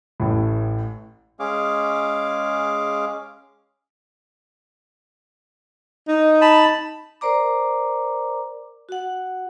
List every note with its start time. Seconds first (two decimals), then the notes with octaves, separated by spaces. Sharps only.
0.20 A1 A2
1.40 G#3 C#4 G#4 F5 D6
6.08 D#4
6.41 A5 B5
7.21 A#4 C5 D5 A#5 D6
8.89 F#4 F#5